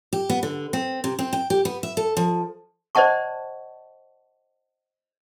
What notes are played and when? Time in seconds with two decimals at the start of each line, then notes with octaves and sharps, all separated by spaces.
0.13 G4
0.29 B3
0.43 D3
0.73 C4
1.04 C3
1.19 C4
1.33 G5
1.50 G4
1.65 B3
1.83 E5
1.97 A4
2.17 F3
2.95 C5 D5 D#5 F#5 A5 C#6